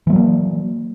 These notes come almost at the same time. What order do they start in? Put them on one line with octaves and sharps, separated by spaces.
E3 A3 F#3 A#3